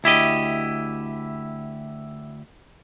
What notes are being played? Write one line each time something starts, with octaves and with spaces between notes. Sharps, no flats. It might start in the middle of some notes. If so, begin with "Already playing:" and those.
D2 E4 G4 D#5